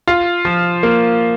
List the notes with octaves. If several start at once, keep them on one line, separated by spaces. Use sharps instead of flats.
F4
F3
A#3